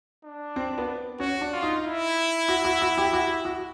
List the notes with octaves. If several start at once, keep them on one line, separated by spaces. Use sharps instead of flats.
D4
C4
B3
C#4 F#4
D4
F4
D#4
E4
F#4
F#4
F#4
G4
F#4
F#4